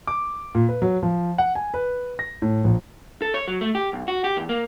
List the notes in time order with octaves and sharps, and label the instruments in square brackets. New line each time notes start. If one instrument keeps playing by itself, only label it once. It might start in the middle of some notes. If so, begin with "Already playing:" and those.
[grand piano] D6
A#2
B4
F#3
F3
F#5
G#5
B4
A#6
A2
A#1
[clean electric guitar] A4
C#5
F#3
A3
G4
B1
F#4
G4
E2
A#3